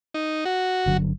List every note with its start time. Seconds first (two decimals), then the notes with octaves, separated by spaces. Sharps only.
0.14 D#4
0.45 F#4
0.86 G1 D3 F#3